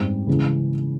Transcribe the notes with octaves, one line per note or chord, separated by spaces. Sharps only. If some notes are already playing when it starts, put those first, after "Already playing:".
Already playing: G#2 G3 C4 G4
C#3 E3 G#3 C#4